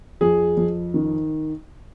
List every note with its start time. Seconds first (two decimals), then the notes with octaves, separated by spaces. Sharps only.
0.21 F2 G#4
0.57 F2
0.94 D#3